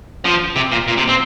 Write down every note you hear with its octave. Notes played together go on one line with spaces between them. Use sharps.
F3
C3
A#2
A#2
C3
C4